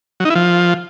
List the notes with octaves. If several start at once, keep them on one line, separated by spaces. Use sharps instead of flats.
F#3
D#4
E4
F3